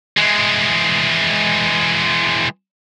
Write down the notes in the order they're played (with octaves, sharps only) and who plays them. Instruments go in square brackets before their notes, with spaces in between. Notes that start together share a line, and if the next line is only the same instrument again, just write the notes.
[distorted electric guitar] E3 G#3